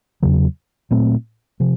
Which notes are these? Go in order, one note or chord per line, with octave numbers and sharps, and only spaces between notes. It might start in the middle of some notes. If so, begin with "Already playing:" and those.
E2 C#3 F#3
A#2 F#3 A3 C4
C3 F3